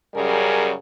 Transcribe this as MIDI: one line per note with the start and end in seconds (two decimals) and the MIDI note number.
0.15 0.73 42
0.15 0.73 49
0.15 0.73 55
0.15 0.73 68
0.15 0.73 70